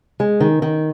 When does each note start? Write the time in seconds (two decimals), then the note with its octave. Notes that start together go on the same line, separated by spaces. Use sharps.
0.20 G#3
0.40 D#3
0.62 D#3